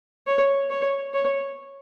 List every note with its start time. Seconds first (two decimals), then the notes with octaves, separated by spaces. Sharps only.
0.27 C#5
0.70 C#5
1.14 C#5